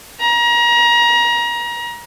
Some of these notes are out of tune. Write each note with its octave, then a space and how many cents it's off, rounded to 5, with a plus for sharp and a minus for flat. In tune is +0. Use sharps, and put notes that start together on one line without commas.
A#5 +30